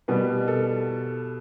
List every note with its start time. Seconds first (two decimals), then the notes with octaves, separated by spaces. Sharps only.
0.08 B2 G3 B4
0.48 A4